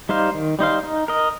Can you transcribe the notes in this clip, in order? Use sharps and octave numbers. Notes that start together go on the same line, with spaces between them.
G3 D#4 C5 F5
D#3
G3 D#4 C5 F5
D#4
A#4 D#5